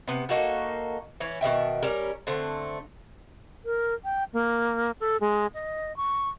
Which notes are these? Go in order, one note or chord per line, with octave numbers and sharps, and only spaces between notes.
C3 B3
A#3 D#4 F#4 A4
E3 C#4
B2 D#3 E5 G5
G3 C#4 A#4
D3 A3 C4
A#4
G5
A#3
A4
G#3
D#5
C#6